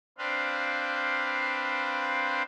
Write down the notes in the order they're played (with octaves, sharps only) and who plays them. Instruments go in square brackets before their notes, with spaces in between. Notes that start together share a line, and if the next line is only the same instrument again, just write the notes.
[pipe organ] C4 D4 B4 C5 F5